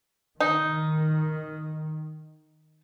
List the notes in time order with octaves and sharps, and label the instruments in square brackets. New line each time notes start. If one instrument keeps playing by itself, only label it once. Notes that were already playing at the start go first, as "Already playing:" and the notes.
[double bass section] D#3 [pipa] D#4